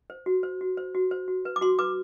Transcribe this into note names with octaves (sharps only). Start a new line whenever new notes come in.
C5
F#4
C5
F#4
C5
F#4
C5
F#4
B4
D6
F#4 C6
B4 D6